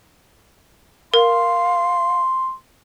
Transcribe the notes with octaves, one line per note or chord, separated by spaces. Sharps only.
A#4 F5 C6